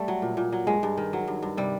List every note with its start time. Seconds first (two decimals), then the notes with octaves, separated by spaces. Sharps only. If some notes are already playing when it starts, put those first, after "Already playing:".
Already playing: G3 A3
0.08 F#3
0.22 A#2
0.37 A#2
0.53 F#3
0.67 G2 G#3
0.83 G2
0.98 D#3
1.13 F#3
1.28 G2
1.42 G2
1.57 C3 G3